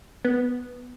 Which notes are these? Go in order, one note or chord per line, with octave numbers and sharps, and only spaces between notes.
B3